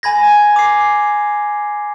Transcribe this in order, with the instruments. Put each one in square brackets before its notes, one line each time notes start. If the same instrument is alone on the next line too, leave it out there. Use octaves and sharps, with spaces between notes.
[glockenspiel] G#5 B5 G#6 A#6
D6 C7